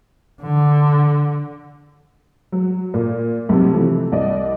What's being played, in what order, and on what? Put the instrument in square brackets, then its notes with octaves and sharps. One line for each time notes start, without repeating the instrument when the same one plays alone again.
[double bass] D3
[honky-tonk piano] F#3
A#2
B1 C3
C3 E3 F3 A3
C2 D5 D#5